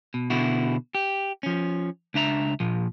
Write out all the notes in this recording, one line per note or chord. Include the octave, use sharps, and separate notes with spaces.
B2
B2 D3 E4 F#4
G4
F3 C#4
C#2 D4 E5 A#5
A#2 F3